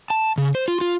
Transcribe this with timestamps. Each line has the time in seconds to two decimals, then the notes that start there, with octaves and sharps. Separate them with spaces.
0.10 A5
0.38 C#3
0.55 C5
0.68 F4
0.81 F4